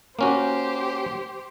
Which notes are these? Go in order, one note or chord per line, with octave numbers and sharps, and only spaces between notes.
A#3 C#4 F#4 G4 C5